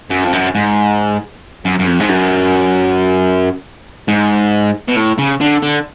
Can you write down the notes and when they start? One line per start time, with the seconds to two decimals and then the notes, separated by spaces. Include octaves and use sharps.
0.10 F#2
0.24 F2
0.33 F#2
0.55 G#2
1.65 F#2
1.79 F#2
1.87 F2
2.00 G#2
2.09 F#2
4.08 G#2
4.89 B2
4.96 A2
5.18 C#3
5.40 D3
5.62 D3